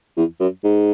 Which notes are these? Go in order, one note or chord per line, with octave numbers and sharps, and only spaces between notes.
E2
F#2
G#2